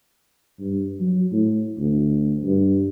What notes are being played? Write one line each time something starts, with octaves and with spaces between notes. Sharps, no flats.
G2
F#3
A2
D2
G2